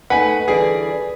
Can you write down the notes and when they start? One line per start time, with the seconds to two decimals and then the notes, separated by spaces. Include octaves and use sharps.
0.10 A3 B3 D#4 B4 F#5 G#5
0.48 D3 E3 G3 G#4